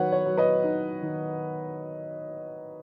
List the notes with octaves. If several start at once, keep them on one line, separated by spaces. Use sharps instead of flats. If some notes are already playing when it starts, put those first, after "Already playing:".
Already playing: D#3 F#3 B4 C#5 F#5
C#5
F#3
B4 D#5
D#4
D#3